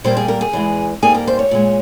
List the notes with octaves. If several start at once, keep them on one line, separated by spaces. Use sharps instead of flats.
A#2 G3 A#3 C5
G#4
A#4
G#4
E2 E3 G#3
G#2 G3 A#3 G#4
A#4
C5
C#5
A#2 G#3